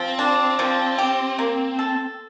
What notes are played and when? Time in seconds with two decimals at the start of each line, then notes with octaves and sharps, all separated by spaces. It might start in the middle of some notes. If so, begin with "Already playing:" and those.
Already playing: F3 C4
0.19 D4
0.59 F3
0.98 G4
1.39 A#3
1.79 A4